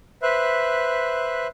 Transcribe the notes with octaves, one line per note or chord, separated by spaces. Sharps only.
B4 C5 E5 F#6